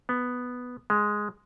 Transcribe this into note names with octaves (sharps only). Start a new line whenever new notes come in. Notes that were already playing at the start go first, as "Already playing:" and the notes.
B3
G#3